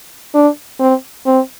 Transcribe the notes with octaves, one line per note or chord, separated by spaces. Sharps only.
D4
C4
C4